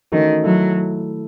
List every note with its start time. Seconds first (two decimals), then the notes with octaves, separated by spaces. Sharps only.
0.12 D#3 E3 A3 C#4 F#4 A4
0.44 D#3 F#3 A3 E4 A4